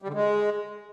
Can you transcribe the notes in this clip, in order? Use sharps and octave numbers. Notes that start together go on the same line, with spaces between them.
G3
D3
G#3